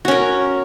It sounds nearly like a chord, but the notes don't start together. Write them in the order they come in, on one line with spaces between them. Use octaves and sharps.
F#4 C#4 A#4